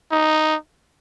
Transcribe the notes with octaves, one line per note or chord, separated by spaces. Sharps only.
D#4